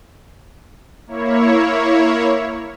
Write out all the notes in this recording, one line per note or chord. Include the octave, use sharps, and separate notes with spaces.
A#3 E4 C#5